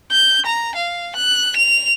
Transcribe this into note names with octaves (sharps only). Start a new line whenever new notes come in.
G6
A#5
F5
F#6
F7